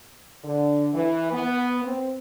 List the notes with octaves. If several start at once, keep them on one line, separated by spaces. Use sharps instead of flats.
D3
E3
B3
C4